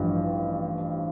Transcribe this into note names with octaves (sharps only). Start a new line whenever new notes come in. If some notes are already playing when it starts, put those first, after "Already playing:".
Already playing: A1 G2 F3